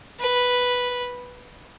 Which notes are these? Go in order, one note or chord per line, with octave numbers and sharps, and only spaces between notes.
B4